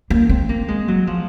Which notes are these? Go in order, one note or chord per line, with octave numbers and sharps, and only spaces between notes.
A#3
C4
A#3
G#3
F#3
F3